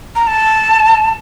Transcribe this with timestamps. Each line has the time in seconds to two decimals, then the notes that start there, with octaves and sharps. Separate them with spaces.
0.16 A#5
0.27 A5